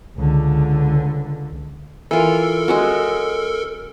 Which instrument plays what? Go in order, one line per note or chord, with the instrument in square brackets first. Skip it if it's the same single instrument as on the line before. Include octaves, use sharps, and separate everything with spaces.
[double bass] C#2 D3
[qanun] E3 F4 [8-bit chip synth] A4 A#4
[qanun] G#3 C#4 F#4